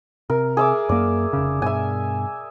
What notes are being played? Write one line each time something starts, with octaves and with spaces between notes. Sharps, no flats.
C3 A#4
G#4 E5 D6
F#2 A#3 D5
F1 C#3
G2 B2 E5 G#5